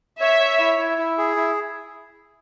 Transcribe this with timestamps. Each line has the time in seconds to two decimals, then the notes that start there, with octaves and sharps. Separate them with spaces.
0.21 C#5 E5
0.39 C#5
0.60 E4
0.79 E4
0.98 E4
1.18 G#4
1.36 E4